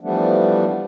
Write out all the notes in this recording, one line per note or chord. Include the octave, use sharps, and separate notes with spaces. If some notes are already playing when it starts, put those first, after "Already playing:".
E3 F3 G3 A3 B3 D4